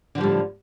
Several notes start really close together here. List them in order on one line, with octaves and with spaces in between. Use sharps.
D3 F3 G3 A2